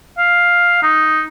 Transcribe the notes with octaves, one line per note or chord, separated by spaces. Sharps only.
F5
D#4